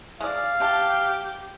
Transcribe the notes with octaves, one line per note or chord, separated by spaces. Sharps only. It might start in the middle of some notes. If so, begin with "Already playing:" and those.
G#3 D5 F5
D3 G4 A5